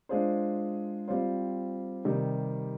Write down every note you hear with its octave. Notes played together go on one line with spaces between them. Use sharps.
G#3 D4 F4 G#4 C5
G3 C4 F4 C5
C3 D#3 G3